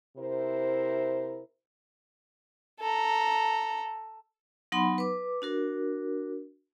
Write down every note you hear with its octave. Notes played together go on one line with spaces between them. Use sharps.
C3 E4 A#4 C5
A4 A#5
F#3 B3 D#4 F#5 B5 C6
B4 D6
D4 F#4 A#4